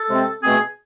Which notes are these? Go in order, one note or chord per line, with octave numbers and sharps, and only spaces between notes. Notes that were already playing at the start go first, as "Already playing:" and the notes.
Already playing: A4
C3 G#3 C4
B2 A3 C4 G#4